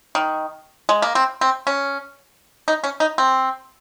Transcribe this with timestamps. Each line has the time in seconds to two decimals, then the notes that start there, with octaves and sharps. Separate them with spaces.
0.15 D#3
0.89 G#3
1.02 A#3
1.15 C4
1.41 C4
1.67 C#4
2.68 D#4
2.84 C#4
3.00 D#4
3.18 C4